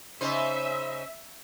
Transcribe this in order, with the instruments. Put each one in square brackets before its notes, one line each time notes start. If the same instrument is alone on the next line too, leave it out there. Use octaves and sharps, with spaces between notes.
[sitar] C#3 D#4 C5 [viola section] E5